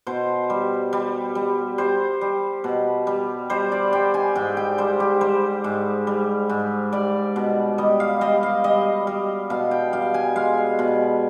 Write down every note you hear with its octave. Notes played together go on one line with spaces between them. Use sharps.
B2 C5
G3
G3
G3
G3 C5
G3
B2
G3
G3 C5
D5
G3 G5
G#5
G#2 G5
G5
G3 C5
G4
G3 C5
G#2
G3
G#2
G3 D5
B2
G3 D#5
F5
G3 D#5
F5
G3 D#5
G3
B2 F5
G5
G3 F5
G#5
G#3 F5
B2